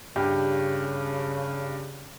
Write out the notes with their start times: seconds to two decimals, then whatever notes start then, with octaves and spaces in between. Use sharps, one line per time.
0.16 G2 C#3 G4